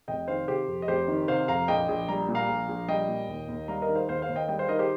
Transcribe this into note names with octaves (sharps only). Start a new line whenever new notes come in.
F1 D#5 G5
D#3 C5 F5
C3 G4 C5
F2
D#5
F1 G4 C5
D#3
C3 C5 F5
F2 F5 A#5
A#1 D#5 G5
A#1
G3 A#5
A#2
F5 A#5
A#1
A#1
G3 D#5 G5
A#2
D#2
D#2
G3 F5 A#5
A#4 D#5
D#3
C5 F5
D#2 C5 F5
C5 F5
D#2
D#5 G5
G3 D#5 G5
C5 F5
D#3 A#4 D#5
G4 C5